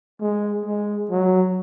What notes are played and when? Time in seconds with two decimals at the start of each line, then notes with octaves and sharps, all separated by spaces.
0.21 G#3
0.66 G#3
1.10 F#3